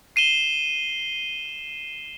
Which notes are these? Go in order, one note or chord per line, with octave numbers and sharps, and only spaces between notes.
C7 D#7 E7 G7